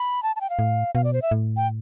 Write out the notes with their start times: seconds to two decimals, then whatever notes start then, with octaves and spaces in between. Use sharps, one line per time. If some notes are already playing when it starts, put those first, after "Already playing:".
Already playing: B5
0.23 A5
0.36 A5
0.41 G5
0.50 F5
0.59 A2
0.95 B2 F5
1.04 D5
1.13 C5
1.22 E5
1.31 A2
1.57 G5